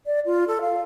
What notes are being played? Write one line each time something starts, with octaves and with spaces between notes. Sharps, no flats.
D5
F4
A4
F5